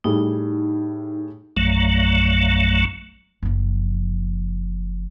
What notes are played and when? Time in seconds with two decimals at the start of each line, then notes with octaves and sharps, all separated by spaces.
0.04 A2 G3 D#4 G#4
1.57 A#1 F#2 F#3 A3
3.43 F#1 F3